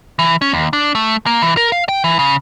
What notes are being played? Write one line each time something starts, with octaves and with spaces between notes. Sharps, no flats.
E3
C#4
D#2
D4
A3
A#3
E3
A#4
F5
G5
E3
C#3